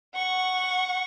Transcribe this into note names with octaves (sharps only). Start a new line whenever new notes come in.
F#5 C#6